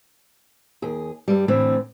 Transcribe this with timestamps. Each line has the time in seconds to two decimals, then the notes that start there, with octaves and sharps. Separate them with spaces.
0.82 D#2 G#4
1.28 G2 G3
1.48 A2 D3 E3 A3 C4